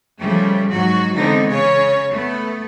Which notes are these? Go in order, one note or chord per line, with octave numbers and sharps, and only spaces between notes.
C#3 F3 G3 A3
G#2 F#3 F#4
D3 E3 G#3 B3 C4 D#4
C#3 C#4 C#5
A3 B3